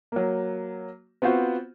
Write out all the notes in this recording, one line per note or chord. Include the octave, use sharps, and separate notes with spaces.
F#3 A#3
B3 C4 F4 F#4 C5